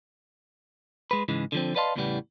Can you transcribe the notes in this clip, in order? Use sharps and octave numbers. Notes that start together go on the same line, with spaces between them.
G#3 B4
G#2 C#3 E3 G#3
D3 F3 C4
B4 D5 D#5 F5 A5 C6
E2 A2 C#3 E3 G3 B3